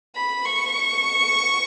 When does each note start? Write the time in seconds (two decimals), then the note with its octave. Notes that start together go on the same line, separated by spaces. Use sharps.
0.16 B5
0.45 C#6